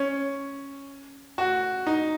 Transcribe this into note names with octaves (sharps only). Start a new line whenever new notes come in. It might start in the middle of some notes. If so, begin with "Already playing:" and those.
Already playing: C#4
F#4
D#4